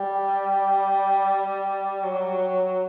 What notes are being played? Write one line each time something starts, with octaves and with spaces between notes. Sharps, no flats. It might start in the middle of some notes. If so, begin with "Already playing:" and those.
Already playing: G3
F#3